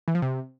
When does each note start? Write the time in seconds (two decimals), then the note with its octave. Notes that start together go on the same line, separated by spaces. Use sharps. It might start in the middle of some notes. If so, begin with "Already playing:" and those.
0.08 E3
0.15 F3
0.22 C3